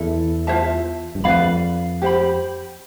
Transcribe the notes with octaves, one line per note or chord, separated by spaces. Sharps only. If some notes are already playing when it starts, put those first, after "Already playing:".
Already playing: E2 E4 A4
F4 C5 E5 A5
G2
F2 B4 D5 F5 B5
G4 C5 G5 B5